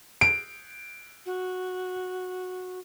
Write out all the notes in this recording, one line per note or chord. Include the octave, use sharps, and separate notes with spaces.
D7
F#4